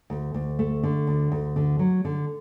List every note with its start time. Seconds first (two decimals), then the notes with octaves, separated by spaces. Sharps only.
0.10 D2
0.34 D2
0.59 A3
0.83 D3
1.07 D2
1.32 D2
1.56 D3
1.79 F#3
2.05 D3